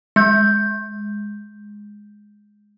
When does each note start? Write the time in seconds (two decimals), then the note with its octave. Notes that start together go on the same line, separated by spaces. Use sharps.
0.16 G#3 G6